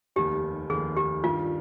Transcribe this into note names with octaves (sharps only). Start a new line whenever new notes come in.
F1 D#2 D#3 G4
F1 D#2 D#3 G#4
G4
G2 D#3 G3 F4